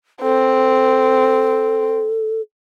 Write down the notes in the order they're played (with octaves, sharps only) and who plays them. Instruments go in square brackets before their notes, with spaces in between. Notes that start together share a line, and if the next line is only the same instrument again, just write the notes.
[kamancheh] C4 [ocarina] A4